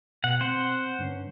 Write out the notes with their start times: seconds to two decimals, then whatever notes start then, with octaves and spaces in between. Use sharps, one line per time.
0.24 B2 F#5 G5
0.41 C4 C5 F#5
0.99 G2 D3 C#4